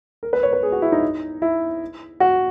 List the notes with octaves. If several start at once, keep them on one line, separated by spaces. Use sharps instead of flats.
A#4
B4
C#5
B4
G#4
F#4
E4
D#4
E4
F#4